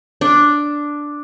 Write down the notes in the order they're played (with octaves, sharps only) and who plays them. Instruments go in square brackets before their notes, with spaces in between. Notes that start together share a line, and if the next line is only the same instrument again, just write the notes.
[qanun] D4